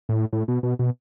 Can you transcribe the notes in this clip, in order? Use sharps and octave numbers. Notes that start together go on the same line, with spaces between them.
A2
A2
B2
B2
B2